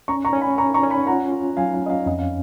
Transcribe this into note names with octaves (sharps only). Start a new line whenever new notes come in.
C#4 A#5 C#6
A#5 C#6
C#4
G#5 B5
C#4 A#5 C#6
A#5 C#6
C#4
G#5 B5
F4 F#5 A#5
F4
F#3 F5 G#5
F5
C#4 D#5
F5
F2 D#5
F5